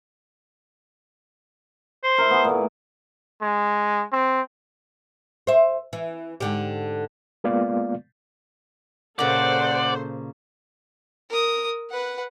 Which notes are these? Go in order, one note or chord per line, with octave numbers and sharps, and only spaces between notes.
C5
E4 A#4
B3 G#4
A#2 A3
G#3
C4
C5 E5
E3
G#2 D3 G4
G#3 A#3 B3 F4 D5 F5
A#2 C#3 A4 C5 D5 F#5
A#4 D#6
B4 F#5